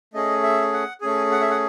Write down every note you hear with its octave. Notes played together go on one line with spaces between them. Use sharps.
A3 C#4 G#4 D#5
E5
F#5
A3 C#4 G#4 G#5
F#5
E5
F#5